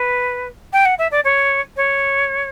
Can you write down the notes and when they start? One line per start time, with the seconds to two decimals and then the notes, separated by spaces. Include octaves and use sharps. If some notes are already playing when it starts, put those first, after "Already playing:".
Already playing: B4
0.73 G5
0.85 F#5
0.99 E5
1.11 D5
1.24 C#5
1.77 C#5